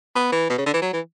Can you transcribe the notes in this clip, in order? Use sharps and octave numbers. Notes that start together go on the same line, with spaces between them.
B3
E3
B2
C#3
D3
E3
F#3
E3